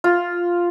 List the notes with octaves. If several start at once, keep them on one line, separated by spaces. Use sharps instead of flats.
F4